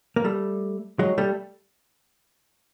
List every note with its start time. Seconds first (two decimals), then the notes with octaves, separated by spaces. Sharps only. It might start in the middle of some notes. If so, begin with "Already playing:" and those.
0.16 A#3
0.24 G3 A3
0.99 F#3 G#3
1.18 G3 A3